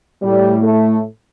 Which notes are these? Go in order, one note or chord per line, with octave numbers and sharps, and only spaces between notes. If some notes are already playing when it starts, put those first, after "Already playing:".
A2 G3
A3